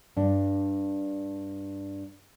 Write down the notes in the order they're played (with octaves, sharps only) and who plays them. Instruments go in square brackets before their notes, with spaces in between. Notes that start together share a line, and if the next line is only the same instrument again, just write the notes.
[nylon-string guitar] G2 D4